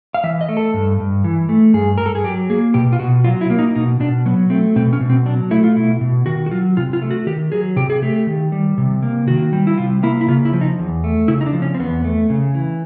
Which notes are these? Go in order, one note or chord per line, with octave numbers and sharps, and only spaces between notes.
F5
E3 E5
D#5
A3
A4
G2
G2
E3
A3
G2 G#4
G2 A#4
A4
G#4
F#3 G4
A#3 G#4
B2 G4
F4
B2 F#4
F#3 F4
E4
A#3
D#4
B2 D#4
B2 D4
F#3 B3
A3 C4
B2 C4
C#4
B2
C4
F#3 D4
A3 E4
F4
B2 E4
B2
D#3 F#4
F#4
F#3 F4
C3 F4
F4
A3
F#4
D#3 G4
F#3 G#4
C3 G4
G#4
A3 G4
D#3
G3
C3
A#3
D#3 F#4
G3
E4
C3 F4
A#3 E4
E4
C#3 F4
E4
F3
D#4
E2
A3
C#3 E4
D#4
D4
F3
C#4
C4
E2 B3
A3
C#3
E3